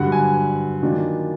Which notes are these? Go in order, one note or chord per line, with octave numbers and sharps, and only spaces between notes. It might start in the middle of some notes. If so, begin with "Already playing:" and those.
Already playing: G2 D3 F#3 F#5
G#5
D#3 F#3 A#3 D4 F4